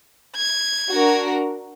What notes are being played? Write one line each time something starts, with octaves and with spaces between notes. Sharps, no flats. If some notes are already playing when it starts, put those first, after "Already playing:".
G#6
D4 F#4 A#4